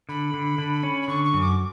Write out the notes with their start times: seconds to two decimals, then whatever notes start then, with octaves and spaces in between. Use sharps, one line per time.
0.09 D3 B5
0.34 D3
0.58 D3
0.83 C#4
1.02 B5
1.08 D3 C#6
1.24 C#6
1.33 F#2
1.41 D6